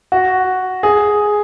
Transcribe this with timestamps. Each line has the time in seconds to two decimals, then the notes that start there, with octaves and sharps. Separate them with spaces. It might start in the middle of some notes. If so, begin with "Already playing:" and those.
0.12 F#4
0.83 G#4